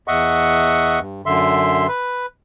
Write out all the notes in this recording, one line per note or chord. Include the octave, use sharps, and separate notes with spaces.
E2 D#5 E5 F#5 C#6
G2
F#2 D3 E5 C6
B4